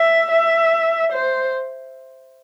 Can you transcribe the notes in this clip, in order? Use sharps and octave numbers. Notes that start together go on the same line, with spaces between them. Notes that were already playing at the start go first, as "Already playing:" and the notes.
Already playing: E5
E5
C5